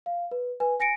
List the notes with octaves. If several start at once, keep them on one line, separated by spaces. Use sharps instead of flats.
F5
B4
B4 G#5
G#5 A#6 C#7 D7